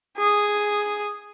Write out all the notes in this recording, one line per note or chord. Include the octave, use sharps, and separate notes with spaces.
G#4